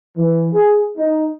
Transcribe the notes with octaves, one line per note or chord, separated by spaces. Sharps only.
E3
G#4
D#4